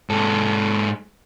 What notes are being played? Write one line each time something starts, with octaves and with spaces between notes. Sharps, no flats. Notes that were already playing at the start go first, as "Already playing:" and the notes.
G#2 A4